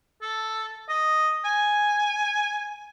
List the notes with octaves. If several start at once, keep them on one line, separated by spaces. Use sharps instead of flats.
A4
D#5
G#5